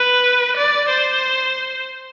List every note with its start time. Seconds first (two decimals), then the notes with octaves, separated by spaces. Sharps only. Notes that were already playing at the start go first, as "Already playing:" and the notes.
Already playing: B4
0.57 D5
0.89 C5